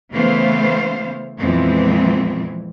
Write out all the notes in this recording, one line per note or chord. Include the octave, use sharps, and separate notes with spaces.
C#3 E3 A3 B3 C5 F5
F2 A#2 E3 G#3 B3 C4